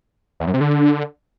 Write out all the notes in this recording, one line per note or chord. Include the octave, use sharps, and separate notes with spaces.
E2
F#2
C3
D3